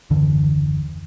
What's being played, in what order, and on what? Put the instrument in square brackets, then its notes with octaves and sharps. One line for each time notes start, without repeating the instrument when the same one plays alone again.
[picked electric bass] F#1 D#2 D3 E3